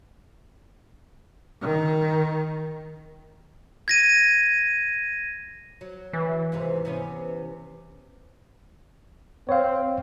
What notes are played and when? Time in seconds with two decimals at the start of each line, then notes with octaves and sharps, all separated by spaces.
1.62 D#3
3.88 G#6 A#6 D#7
5.81 F#3
6.13 E3
6.52 D#2 G#2 C3
6.85 C3 B3 C#4
9.49 C4 C#5 F5